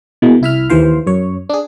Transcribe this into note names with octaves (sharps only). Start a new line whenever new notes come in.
B2 E3 G#3 A#3
C2 E4 E5 F6
D#2 E3 C5 F5
F#2 C#5
D4 G#4